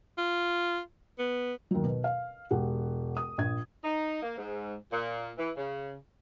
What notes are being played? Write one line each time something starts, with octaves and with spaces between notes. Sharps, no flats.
F4
B3
D#2 F#3
B2
F5
E1 G4 F#5
D#6
A#1 G#6
D#4
A#3
G#2
A#2
E3
C#3